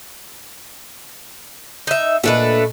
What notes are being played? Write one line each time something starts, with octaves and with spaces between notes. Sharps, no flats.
D#4 E5
A#2 A3 D4 B4 D#5